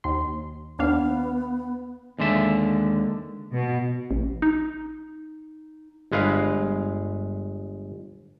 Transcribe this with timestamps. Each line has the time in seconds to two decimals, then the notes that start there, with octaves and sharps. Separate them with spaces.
0.04 D#2 C6
0.79 D#2 B3 D4 F5
2.19 D#2 D3 G#3 E5
3.52 B2
4.11 A1
4.42 D#4
6.12 G1 G#3 B4 F5